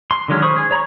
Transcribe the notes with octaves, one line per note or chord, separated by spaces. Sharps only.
C6
D3 D#3 F#3 G#3 C#4
C5 B5 C#6 D#6
G#4
C#5 A#5 B5 C#6